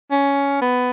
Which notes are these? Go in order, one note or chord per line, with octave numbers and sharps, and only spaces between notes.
C#4
B3